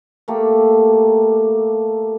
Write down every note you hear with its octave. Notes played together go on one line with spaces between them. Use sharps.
A3 A#3 G4 A4